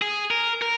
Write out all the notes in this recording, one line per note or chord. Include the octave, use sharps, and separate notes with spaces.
G#4
A#4
A#4